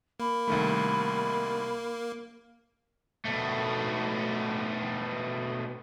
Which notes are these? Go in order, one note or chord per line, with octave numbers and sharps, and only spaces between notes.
A#3 B5
C2 D#3 A3
B2 A3